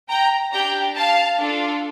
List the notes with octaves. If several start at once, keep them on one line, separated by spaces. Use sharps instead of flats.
G5 A#5
D4 G4 G5 A#5
F5 A5
D4 F4 A4